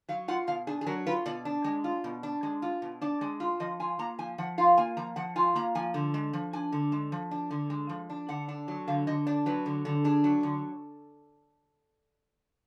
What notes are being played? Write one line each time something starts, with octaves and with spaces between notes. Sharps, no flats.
F#3 F5
F4 F#5
B2 F5
D4 G#4
G#4
F#3 A#4
F4 B4
B2 D5
D4
G#3
F4
B2
D4
G#3
F4
B2
D4 D5
G#3
F4
F3 D#5
F4 G#5
A#3 A#5
F3 G#5
F3 F#5
F4 F5
A#3 G#5
F3 A#5
F3 F#5
F4 G#5
A#3 A#5
F3 G#5
D3
G#3
F3
D4 G#5
D3
G#3
F3
D4
D3
G#3
F3
D4
D3 F#5
D4
F#3
D3 F5
D3 D#5
D4 D5
F#3 B4
D3
D3
D4 G#4
F#3
D3